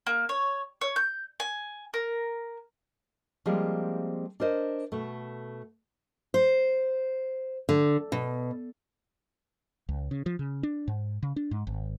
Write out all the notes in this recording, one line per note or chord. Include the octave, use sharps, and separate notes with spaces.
A#3
C#5
C#5
G6
G#5
A#4
F3 G3 G#3 A#3 C4
D4 A#4 C5 D#5
B2 A3
C5
D3
B2
C#2
C#3
F3
C#3
D4
G#2
C#3
D4
G#2
G#1